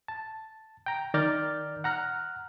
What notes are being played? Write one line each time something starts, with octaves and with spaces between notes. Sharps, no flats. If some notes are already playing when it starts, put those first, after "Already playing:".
A5
G5 A#5
D#3 D5 A#5 F6 G6 A6
F#5 A#5 F6 F#6